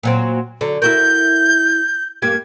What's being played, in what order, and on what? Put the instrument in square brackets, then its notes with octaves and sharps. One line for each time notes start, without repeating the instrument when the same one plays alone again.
[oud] A#2 F#3 C4
D3 F#3
[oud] E4 F#4 A#4 [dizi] G6
[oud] G2 A#3 G4 [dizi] G#6